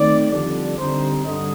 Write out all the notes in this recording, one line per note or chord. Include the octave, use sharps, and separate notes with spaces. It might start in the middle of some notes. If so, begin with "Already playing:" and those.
Already playing: D#3 A3 C4 D#4 D5
F2 D3 G3 D4
D3 G3 C4 D#4 C5
G2 D3 G3 D#5